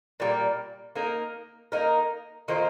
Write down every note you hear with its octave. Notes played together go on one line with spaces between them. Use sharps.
A#2 G3 A#3
A#3 D#4 A#4
A#3 D#4 A#4
D#3 A#3 F4 C5